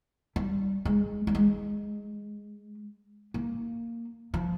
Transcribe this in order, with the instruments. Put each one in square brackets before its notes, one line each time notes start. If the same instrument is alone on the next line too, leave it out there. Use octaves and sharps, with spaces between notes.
[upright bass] G3
G#3
G3
G#3
A#3
F3